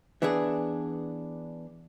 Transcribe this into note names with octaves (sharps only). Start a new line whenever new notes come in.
E3 B3 D4 G#4